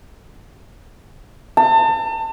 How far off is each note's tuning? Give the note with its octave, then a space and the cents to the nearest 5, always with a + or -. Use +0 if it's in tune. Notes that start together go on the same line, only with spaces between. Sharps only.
A5 +35